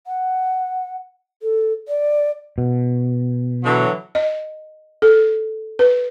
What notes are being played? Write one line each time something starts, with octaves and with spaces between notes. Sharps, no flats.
F#5
A4
D5
B2
D3 E3 F#3
D#5
A4
B4